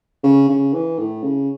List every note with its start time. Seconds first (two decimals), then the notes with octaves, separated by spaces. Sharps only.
0.23 C#3
0.49 C#3
0.73 E3
0.99 A2
1.23 C#3